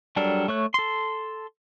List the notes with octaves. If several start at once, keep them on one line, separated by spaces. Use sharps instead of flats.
F#3 G3 D4 A4 A#4
A3 C#5 F#6
A4 C6